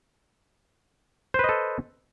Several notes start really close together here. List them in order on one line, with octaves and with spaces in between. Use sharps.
C5 B4 D#5 A4